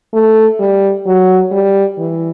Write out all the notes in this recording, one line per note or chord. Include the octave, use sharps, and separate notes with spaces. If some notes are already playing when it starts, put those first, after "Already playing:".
A3
G3
F#3
G3
E3